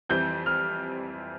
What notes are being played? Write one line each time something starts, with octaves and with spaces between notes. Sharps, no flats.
F2 E3 G3 C4 G6
F6